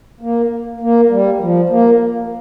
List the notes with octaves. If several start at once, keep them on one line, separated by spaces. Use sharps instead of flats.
A#3
A#3
G3
F3
A#3